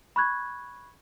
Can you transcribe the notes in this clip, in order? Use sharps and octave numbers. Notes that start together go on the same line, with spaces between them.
B5 C#6 F#6 G#6